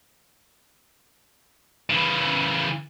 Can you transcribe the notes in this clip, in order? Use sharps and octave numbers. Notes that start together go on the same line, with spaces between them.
C#3 E3